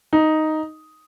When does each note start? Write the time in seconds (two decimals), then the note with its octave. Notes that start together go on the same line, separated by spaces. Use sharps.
0.13 D#4